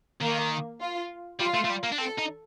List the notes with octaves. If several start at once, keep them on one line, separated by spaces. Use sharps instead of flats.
D#3 A#3
F4
G3 F4
A3
A3
G3
A#3
D4
C4 A4
D#4